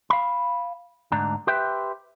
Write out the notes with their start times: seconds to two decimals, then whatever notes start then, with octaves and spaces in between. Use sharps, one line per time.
0.10 F5 B5
1.12 D2 G#2 D4 A#5
1.47 G4 B4 C5 E5 G5